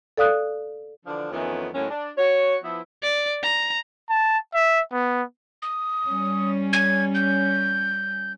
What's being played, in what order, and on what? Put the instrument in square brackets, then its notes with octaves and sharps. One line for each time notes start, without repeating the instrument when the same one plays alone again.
[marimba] A4 D5 F5 D#6 F#6
[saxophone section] D3 E3 F3 D4
F2 D#3 E3 A3 B3 C#4
A2 D#3 F#3 G#3 A#3 C#4
D4
F#4 C#5
F3 B3 E4
[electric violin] D5
A#5
[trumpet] A5
E5
B3
[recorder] D#6
[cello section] G3 C#4
[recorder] G#6
G6